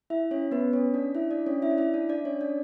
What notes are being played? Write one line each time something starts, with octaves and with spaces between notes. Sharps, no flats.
E4 E5
C#4 C#5
B3 B4
C#4 C#5
D4 D5
E4 E5
D4 D5
C#4 C#5
E4 E5
D5
E4 E5
D4 D5
D4 D5
C#4 C#5
D4 D5